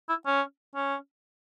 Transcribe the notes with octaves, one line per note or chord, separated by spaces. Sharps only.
E4
C#4
C#4